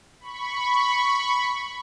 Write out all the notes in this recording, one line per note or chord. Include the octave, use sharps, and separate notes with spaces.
B5 C#6